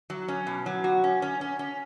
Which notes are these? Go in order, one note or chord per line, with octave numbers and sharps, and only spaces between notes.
F#3
C#4
B2
F#3
F#4
C#4
C#4
C#4
C#4